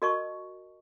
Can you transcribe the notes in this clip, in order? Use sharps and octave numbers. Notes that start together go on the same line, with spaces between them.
F#4 A#4 D#5 A5 C#6